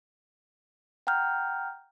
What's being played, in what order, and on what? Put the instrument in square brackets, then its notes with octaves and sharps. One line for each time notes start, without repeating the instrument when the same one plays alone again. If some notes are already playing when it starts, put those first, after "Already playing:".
[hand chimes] F#5 G5 A#5 F6 G6